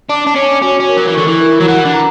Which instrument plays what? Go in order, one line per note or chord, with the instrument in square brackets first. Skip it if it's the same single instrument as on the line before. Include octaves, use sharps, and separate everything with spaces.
[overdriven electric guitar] D4 [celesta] D6
[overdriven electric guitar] D4
[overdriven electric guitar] C#4 [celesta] D6
[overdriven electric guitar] C#4 [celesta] F#4
[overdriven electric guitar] C#4
[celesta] A#4
[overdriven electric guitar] F#3
E3
[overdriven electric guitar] D3 [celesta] C#6
[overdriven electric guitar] E3
[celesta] A#4
[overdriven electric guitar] F#3
[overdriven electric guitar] E3 [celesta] F#5
[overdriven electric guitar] D3
[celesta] A#5